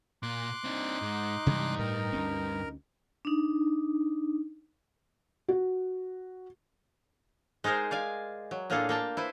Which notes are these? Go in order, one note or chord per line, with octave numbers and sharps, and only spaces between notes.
A#2 C6 D6 F#6
C4 D4 D#4
G#2
G2 C3 E3 G#3
A2 A#4
D2 B3 C#4
D4 D#4
F#4
G#3 D#4 G#4 A#4 C5
D5 F5 G#5
F#3
A2 A#3 D4 F4 G#4 A4
A#3 G5 A5
E4 B4 C5